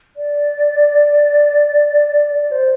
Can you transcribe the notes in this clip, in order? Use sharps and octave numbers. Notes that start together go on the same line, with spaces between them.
D5
D5
C5